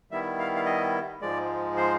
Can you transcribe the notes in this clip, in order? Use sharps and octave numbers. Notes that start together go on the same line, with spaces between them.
D#3 G3 B3 E4 E5
F5
F5
D#5
G#2 F3 G#3 D5
C5